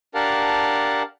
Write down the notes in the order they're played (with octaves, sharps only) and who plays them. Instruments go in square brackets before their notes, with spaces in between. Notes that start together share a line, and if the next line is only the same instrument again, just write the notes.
[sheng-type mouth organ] D4 G4 A#4 F5 F#5 A5